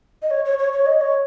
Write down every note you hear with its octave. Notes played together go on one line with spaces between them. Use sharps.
D#5
C#5
C#5
C#5
C#5
D#5
C#5